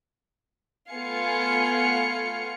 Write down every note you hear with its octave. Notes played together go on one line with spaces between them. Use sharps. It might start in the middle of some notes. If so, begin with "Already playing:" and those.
A3 B3 F4 F5 G#5 C#7